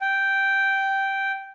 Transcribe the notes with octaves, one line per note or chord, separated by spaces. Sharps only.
G5